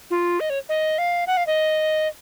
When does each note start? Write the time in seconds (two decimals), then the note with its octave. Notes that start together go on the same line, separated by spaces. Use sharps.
0.10 F4
0.40 D#5
0.50 C#5
0.69 D#5
0.98 F5
1.27 F#5
1.37 F5
1.47 D#5